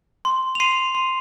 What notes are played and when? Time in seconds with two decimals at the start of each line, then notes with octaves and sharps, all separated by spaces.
0.25 C6
0.55 F7
0.60 C6 C7 D#7
0.95 C6